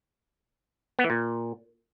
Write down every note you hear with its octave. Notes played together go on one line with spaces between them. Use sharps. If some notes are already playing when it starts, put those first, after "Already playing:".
B3
E3
A#2